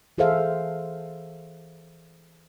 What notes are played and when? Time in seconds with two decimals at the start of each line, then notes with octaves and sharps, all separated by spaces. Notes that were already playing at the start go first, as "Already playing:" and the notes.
0.18 E3 G#4 A4 C5 E5 F5